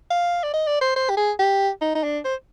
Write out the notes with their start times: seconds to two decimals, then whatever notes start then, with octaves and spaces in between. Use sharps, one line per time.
0.10 F5
0.43 D5
0.54 D#5
0.67 D5
0.81 C5
0.96 C5
1.10 G4
1.17 G#4
1.39 G4
1.81 D#4
1.95 D#4
2.03 D4
2.25 C5